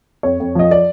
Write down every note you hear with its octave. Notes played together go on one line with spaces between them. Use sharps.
F2 C#5
F2
F3 D#5
D5